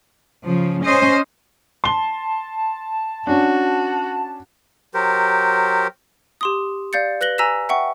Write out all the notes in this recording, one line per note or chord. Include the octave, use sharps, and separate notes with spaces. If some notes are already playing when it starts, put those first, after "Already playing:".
C#3 F3
C#4 C5 D#5
A5 C6 G7
C#4 D4 F#4
F#3 G4 A#4 C5
G4 C6 D#6
D5 F5 G6 A6 C#7
B4 F#6 A#6 F#7 G7
G#5 A#5 E6 A#6 B6 E7
E5 F#5 G5 C#6